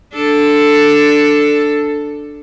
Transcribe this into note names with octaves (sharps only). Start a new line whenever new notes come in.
D4 A4